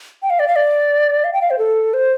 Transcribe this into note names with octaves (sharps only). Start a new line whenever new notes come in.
G5
F5
D5
F5
D5
F5
G5
F5
C5
A4
C5